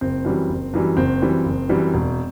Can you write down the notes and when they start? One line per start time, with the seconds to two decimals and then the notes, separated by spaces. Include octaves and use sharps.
0.01 F#1 C4
0.25 F#2 E3 G3
0.49 F#1
0.74 F#2 E3 G3
0.97 F#1 C4
1.22 F#2 E3 G3
1.45 F#1
1.69 F#2 E3 G3
1.94 E1